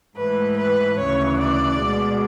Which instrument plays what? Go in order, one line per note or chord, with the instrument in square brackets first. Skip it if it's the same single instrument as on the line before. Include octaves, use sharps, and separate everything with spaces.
[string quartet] G#2 E3 A3 B4
B4
D2 C#3 E3 C#5
D5
B2 G#3